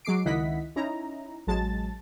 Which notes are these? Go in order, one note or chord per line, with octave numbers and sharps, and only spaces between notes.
F#3 G#3 D6 C7 D7
C#2 D#3 E4 D#5 F#5 B6
C#4 D#4 E4 A#5
A1 F#3 G#3 A5 A6